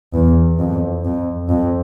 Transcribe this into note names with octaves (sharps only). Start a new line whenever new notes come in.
E2
F2
F2
F2